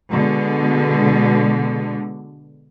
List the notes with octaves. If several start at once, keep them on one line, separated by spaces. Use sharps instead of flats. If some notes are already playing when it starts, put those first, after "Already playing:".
B2 D3 G#3